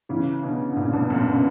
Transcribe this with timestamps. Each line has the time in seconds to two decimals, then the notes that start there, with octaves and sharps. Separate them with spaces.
0.09 C#3 E3
0.43 B2 D3
0.72 D3
0.77 A#2 C#3
0.93 G2 B2
1.10 F#2 A#2
1.23 C#3
1.27 B2